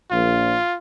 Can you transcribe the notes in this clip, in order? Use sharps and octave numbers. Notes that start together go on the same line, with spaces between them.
A#1 F4